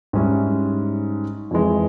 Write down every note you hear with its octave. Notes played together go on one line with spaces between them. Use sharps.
G#2 G3 C#4 E4
F2 E3 G#3